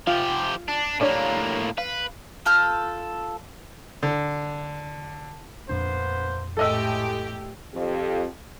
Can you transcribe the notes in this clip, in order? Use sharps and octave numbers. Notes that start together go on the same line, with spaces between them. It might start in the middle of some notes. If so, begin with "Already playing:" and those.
F3 F4 G4
D4
A2 A#3 D4 G4 C#5
B4 F5
F4 A4 F6 G6
D3
F2 A#2 A#3 B3 D4 C5
A2 G#3 A3 G4 A4 D#5 E6
F2 G4